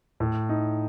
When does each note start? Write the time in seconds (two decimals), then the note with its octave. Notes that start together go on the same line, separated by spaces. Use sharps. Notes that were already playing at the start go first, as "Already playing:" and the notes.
0.20 A2
0.49 D#4